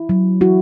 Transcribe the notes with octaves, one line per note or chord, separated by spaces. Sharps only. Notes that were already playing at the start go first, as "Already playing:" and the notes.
Already playing: E4
F#3
E4 F#4